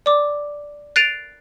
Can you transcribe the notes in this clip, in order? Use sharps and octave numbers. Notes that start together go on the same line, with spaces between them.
D5 D6
F#6 A6 C7 D7 D#7 F7